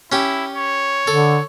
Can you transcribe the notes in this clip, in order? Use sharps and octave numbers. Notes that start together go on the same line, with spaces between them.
C#4 E4 G4
C#5
D3 A4